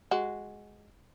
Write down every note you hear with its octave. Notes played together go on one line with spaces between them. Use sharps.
G#3 F#4